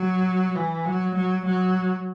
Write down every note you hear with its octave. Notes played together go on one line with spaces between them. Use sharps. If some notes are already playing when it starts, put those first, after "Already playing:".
Already playing: F#3
E3
F#3
F#3
F#3